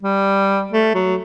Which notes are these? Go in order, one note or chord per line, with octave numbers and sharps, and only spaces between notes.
G3
A3
F#3